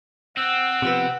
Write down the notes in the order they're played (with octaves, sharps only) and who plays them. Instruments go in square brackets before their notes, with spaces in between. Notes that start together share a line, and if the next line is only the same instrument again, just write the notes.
[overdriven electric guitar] C4 [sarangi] F#5 [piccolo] E6
[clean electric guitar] C3 F3 B3